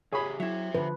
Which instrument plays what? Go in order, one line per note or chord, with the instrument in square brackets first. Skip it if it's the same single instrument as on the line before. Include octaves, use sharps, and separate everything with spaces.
[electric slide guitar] C#3 G4 [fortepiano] G#4 C#5 B5
[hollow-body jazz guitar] F#3 E4 [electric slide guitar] C5 E5
[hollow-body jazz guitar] D3 F3 [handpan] B4